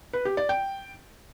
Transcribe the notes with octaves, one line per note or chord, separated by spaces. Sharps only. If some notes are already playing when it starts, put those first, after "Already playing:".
B4
G4
D5
G5